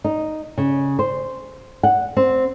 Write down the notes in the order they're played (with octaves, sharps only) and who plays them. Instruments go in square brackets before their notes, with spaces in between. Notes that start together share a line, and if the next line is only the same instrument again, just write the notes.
[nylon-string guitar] D#4
C#3
C5
F#5
C4